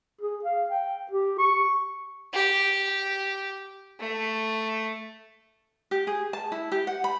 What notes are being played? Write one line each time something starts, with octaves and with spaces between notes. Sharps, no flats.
G#4
F5
G5
G4
C#6
G4
A3
G4
G#4
A5
E4
G4
F#5
B5